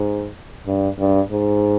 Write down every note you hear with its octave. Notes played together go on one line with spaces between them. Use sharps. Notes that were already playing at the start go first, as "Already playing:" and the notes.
Already playing: G#2
G2
G2
G#2